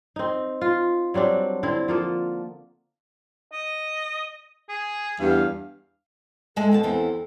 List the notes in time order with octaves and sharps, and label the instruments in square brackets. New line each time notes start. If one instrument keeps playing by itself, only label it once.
[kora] C4 D#4
F4
F#3 G3 C4 D4
D3 C4 E4
F3 A#3 A4
[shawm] D#5
G#4
[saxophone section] E2 G2 [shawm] F5
[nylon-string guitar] G#3 E5 A5 [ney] A4
[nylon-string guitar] D#2 B2 A5
E2 E3 C4